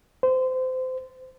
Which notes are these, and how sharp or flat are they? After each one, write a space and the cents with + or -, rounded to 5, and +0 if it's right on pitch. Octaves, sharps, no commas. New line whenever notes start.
C5 -25